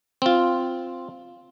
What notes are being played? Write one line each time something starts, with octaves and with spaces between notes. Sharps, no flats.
C4 F4